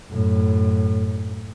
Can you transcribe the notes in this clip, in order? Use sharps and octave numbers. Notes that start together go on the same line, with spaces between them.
F#2 A2